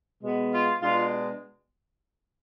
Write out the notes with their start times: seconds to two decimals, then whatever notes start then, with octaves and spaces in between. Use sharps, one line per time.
0.20 B2 G#3 B3
0.51 F4
0.81 B2 G#3 D4 F4